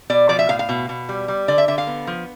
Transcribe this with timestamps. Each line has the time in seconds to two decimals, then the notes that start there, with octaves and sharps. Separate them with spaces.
0.10 B2 D5
0.29 F3 D5
0.39 E5
0.49 A2 F5
0.59 F5
0.69 B2
0.89 B2
1.09 G3
1.28 G3
1.48 D3 D5
1.58 E5
1.68 D3 E5
1.78 F5
1.87 B3
2.07 F3